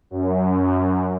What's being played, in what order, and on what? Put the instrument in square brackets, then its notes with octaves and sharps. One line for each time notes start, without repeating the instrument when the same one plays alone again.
[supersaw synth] F#2